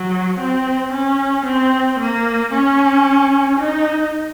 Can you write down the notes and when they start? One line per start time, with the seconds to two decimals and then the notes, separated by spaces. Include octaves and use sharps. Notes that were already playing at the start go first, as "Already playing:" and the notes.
Already playing: F#3
0.39 C4
0.92 C#4
1.45 C4
1.99 A#3
2.53 C#4
3.59 D#4